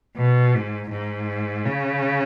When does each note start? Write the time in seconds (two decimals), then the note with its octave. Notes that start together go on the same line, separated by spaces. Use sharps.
0.17 B2
0.54 G#2
0.91 G#2
1.66 C#3